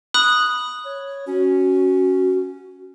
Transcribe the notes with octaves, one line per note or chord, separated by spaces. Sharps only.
B5 D#6 F#6
C#5
C#4 F#4